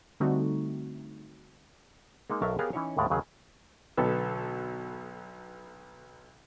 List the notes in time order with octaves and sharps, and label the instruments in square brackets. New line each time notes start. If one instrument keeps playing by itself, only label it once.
[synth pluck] D3 G3 A3 C4 D#4 F#4
[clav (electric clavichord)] G#3 A#3 D#4
B1 F#3 A#4 E5 F5 A5
B3 G4 G#4 A#4 C#5 F5
E3 C#4 D#4 E4 C#5
D#2 A2 G#3 D5 F5 A#5
D#2 C#3 F#3 G#4
[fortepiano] B1 B2 D3 B3 A4